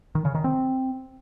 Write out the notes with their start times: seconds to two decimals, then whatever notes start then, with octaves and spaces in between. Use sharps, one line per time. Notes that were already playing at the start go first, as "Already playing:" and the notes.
0.15 D#3
0.25 C#3
0.35 D#3
0.44 C4